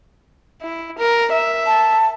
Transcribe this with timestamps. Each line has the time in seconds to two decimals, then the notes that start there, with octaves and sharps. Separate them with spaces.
0.62 E4
0.98 A#4
1.32 E5
1.67 A5